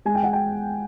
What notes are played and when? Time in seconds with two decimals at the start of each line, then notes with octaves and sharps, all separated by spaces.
0.05 G#3 G#5
0.15 G5
0.23 F#5
0.33 G5